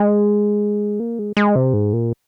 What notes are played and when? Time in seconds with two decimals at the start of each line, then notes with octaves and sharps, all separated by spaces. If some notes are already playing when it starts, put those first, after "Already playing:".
Already playing: G#3
1.00 A#3
1.19 G#3
1.37 G#3
1.55 C3
1.73 G#2
1.93 A#2